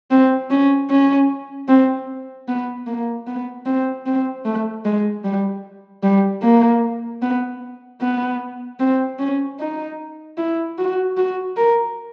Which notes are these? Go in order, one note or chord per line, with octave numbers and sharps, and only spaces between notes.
C4
C#4
C#4
C4
B3
A#3
B3
C4
C4
A3
G#3
G3
G3
A#3
B3
B3
C4
C#4
D#4
E4
F#4
F#4
A#4